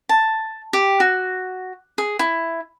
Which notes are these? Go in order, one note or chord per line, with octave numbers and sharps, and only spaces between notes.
A5
G4
F#4
G#4
E4